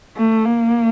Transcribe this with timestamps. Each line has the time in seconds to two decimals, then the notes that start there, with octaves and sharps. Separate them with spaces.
0.17 A3
0.46 A#3